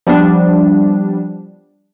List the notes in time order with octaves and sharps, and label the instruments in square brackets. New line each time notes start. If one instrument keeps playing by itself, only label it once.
[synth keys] F3 G3 B3 D4